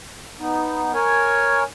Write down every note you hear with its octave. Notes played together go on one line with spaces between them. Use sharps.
B3 D#4
A#4 C#5 G#5